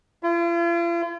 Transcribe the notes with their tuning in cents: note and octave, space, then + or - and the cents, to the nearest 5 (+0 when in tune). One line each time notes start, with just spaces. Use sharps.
F4 -45